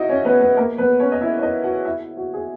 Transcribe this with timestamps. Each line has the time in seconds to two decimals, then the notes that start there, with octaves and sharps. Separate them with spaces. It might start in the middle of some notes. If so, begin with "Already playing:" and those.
Already playing: D#4 E4 F#4 D#5 E5
0.09 C#4 C#5
0.25 B3 B4
0.40 B3 B4
0.57 A#3 A#4
0.78 B3 B4
1.00 C#4 C#5
1.12 D#5
1.21 E4 E5
1.38 C#5
1.42 D#4 D#5
1.64 F#4 F#5
1.85 E4 E5
2.17 F#4
2.33 G#4